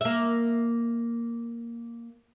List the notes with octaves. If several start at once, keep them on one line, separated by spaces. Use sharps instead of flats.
A#3 E5